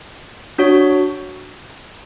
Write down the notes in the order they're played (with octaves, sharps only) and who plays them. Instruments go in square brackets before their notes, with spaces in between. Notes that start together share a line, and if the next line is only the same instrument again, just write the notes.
[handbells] D4 F#4 C#5